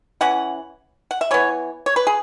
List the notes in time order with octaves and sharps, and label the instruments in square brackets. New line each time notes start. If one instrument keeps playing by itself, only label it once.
[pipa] E3 C#4 F#5
F#5
E5
E3 B3 C#5
C#5
B4
G#4